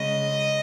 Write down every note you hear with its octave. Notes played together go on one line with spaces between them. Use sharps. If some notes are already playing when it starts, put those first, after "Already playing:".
Already playing: C#3 G#3 D#5